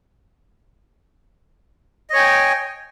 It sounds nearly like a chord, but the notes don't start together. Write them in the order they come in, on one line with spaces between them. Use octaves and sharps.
D#5 C#5 G#5 G5